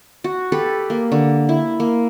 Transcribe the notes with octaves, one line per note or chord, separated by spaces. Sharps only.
F#4
G4 A4 B4
A#3
D3
E4
A#3